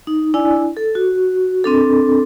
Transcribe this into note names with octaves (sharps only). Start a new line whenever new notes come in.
D#4
D4 E4 D5 G#5
A4
F#4
C4 D4 A4